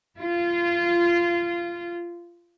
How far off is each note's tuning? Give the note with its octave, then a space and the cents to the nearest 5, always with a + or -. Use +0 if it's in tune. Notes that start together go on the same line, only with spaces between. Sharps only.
F4 -20